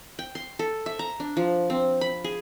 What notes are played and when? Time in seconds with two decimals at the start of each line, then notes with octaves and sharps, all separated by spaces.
0.19 G5
0.35 C6
0.59 A4
0.86 E5
0.99 A#5
1.20 D4
1.37 F3
1.70 C4
2.01 B5
2.24 G#4